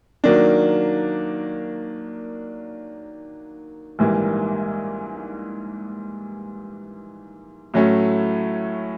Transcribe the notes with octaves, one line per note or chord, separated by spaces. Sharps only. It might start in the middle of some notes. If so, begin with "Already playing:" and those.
D#3 F#3 A#3 D4
A#1 G#2 E3 G3 A#3
A2 F#3 A3 C#4